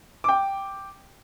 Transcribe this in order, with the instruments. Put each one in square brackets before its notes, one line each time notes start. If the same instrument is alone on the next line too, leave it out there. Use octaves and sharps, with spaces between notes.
[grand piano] G5 D6